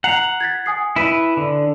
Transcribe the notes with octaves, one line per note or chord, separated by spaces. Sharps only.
F#5 A#5 C7 F7
G#6 A6 B6
G#5 D#6 C7
E4 B4
D3